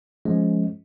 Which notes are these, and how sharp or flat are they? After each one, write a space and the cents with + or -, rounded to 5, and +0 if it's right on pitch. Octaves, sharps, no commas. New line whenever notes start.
F3 +0 G#3 +15 C#4 +0